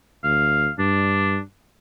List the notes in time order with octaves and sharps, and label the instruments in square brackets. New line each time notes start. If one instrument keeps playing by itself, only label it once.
[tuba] D2 [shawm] F5
[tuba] G2 [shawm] D4